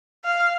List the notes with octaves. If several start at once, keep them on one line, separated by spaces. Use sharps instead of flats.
F5